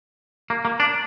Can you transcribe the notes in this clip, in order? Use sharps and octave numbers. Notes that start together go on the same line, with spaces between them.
A#3
A#3
D4